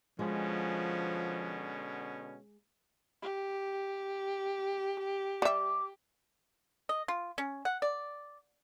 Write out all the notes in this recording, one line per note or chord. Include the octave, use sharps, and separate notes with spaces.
B2 D3 F3 G#3 C#4
G4
G3 E5 D6
D#5
F4
C#4
F#5
D5